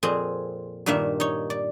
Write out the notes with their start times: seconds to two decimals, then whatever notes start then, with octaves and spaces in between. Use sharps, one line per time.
0.03 F2 A#2 C4 G#4
0.86 G2 A#2 D#3 A#3 E5
1.20 D#4 C#5
1.50 D5